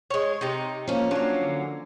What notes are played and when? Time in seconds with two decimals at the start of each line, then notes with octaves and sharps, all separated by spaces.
0.10 G#3 C#5
0.41 C3 D#4
0.87 F3 A#3 C#4
1.11 F#3 A#3 D4
1.40 D3